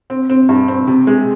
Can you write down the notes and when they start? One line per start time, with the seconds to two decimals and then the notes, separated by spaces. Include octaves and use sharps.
0.10 C4
0.29 C4
0.49 G2
0.68 C4
0.87 C3
1.07 G#3